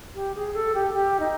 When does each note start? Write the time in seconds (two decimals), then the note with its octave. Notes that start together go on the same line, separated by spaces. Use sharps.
0.15 G4
0.35 G#4
0.54 A4
0.74 G4
0.94 G4
1.20 D#4